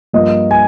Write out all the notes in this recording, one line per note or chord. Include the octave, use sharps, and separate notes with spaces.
G2 F3 A#3 D#5
G#5